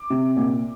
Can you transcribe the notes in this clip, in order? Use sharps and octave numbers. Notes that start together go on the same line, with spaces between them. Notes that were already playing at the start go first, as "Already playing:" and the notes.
Already playing: D6
C3
A#2